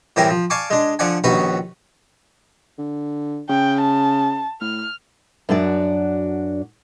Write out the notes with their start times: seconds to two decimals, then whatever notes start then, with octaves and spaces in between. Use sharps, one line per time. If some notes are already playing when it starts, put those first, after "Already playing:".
0.16 A2 E3 G3 C4 A#4 G#5
0.30 F3
0.50 D5 F5 G#5 A5 C#6 D6
0.70 G#3 D4
0.99 D3 F3 D5 F#5 G#5
1.24 A#1 D#2 C#4 F#4 B4 C#6
2.78 D3
3.49 C#3 G5
3.81 A5
4.61 A2 F6
5.49 F#2 D4 F#4 D5